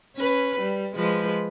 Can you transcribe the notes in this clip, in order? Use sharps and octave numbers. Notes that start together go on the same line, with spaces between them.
C#4 B4
G3
F3 G#3 B4